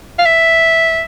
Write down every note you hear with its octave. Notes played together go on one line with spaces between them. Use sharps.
F5
E5